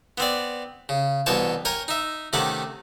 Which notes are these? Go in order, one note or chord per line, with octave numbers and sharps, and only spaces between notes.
B3 C4 D5
C#3
C2 B2 E3 C#5 G5 A5
A#4 C#5 G5 G#5 A#5
D#4 E5
C3 D#3 A3 C#4 F#5 D6